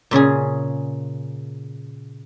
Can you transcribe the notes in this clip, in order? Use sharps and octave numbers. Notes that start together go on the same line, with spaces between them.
A#2 C#3 C#4 G#4